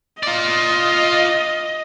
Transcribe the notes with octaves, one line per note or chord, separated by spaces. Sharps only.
F4 D5 D#5